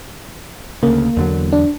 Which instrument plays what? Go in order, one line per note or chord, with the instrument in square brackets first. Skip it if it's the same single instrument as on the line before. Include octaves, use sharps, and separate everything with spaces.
[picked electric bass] D2 C#3 [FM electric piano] A#3
[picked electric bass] E2 D3 F#3
[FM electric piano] D4